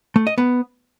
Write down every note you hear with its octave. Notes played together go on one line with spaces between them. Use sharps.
A3
D#5
B3